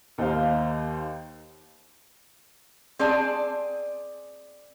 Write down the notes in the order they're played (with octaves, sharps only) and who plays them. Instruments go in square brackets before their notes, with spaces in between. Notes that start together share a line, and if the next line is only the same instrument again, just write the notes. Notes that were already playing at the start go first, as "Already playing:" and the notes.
[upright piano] D#2 D#4 C5 F5
[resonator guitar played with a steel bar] C4 G#4 D5 G#5 A5